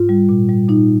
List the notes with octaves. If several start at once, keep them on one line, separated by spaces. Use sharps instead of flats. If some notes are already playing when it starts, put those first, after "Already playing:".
Already playing: G#2 F4
G3
A#2
G3
A#2 D#4